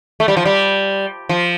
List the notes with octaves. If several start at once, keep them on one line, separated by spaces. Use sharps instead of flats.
A3
G3
F3
G3
F3